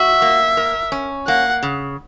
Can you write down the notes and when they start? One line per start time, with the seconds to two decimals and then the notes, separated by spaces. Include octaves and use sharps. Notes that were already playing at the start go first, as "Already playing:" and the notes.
Already playing: F#4 E5
0.22 A#3
0.57 A#4
0.92 C#4
1.27 A#3 F#5
1.63 C#3